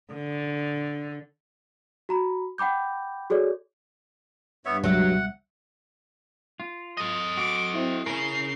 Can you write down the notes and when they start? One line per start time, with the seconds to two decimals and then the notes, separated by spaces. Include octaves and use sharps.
0.13 D3
2.09 F#4 A#5 B5
2.58 F#5 G5 B5 D6 G6
3.30 F#4 G#4 A4 C#5 D5
4.65 G2 B3 C#5 E5
4.84 C#2 B2 F#3 E5 F#5
6.60 F4
6.97 A4 D#5
7.37 F#4 D6
7.74 C4 E4
8.06 C#3 C#4 A#4 C7